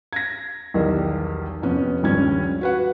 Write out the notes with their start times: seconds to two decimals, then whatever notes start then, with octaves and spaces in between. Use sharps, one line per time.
0.13 G#6 A#6
0.74 B1 E2 D#3 G3
1.62 F2 C3 F3 B3 C#4
2.03 D#1 G#1 G2 F3 C#4 G#6
2.61 F#4 B4 F#5